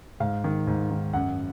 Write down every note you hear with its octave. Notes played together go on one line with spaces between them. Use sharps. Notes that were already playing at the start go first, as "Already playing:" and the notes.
G#2 F5
D#3
G#2
D#3
F#2 F#5